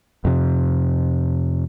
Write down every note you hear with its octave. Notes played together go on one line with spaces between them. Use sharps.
F2 C3